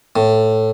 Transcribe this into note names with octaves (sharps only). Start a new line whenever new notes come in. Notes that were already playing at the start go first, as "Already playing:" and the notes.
A2